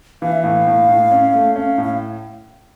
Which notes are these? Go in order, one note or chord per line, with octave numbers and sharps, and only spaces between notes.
E3 F5
E5
A2 F5
A2
A2
C#4
A3
C#4 F5
A2
F5